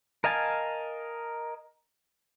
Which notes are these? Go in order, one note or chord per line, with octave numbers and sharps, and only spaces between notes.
A#4 D#5 F5 G#5 A5